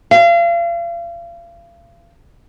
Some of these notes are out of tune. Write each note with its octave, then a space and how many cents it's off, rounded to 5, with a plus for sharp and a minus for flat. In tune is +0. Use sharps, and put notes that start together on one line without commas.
F5 -35